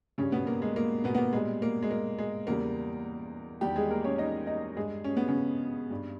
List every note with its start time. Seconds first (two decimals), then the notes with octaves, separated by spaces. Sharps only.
0.18 G2 C#3 G3 C#4
0.32 B2 B3
0.47 A#3
0.62 G#3
0.76 A#3
1.04 B2 B3
1.15 B3
1.18 A#3
1.33 A#2 G3 G#3
1.62 A#3
1.83 G#3
1.91 A#3
2.19 G#3
2.47 E2 C#3 G3 A#3
3.61 E2 D#3 G3 G4
3.76 G#3 G#4
3.91 A#3 A#4
4.04 C#4 C#5
4.18 D#4 D#5
4.47 D#4 D#5
4.76 G2 G3 G#3 G#4
5.04 C#4
5.17 B3
5.28 C#3 C#4
5.90 G2 G3